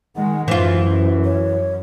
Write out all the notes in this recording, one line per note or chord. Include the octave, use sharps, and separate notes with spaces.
D#3 G#3 F#5
F#2 E3 F4 C5
C#5